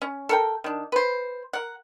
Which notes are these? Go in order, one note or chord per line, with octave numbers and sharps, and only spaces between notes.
C#4
A4 A#4 G5
D#3 D4
B4 C5
A#4 F#5